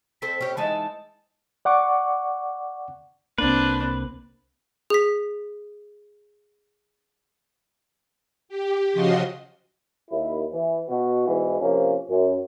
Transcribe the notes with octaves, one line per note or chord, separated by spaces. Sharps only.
C4 A4 C5 B6
C#4 G4
E3 G#3 D#4 A5
D5 F#5 C#6 D6
C2 A#3 C4 D4 B4
G#4 B6
G4
C#3 F3 F4 F#4 D#5 C6
D#2 E4
E3
B2 F#4
E2 G#2 B2 E3
C3 F3 A#3 C#4
F#2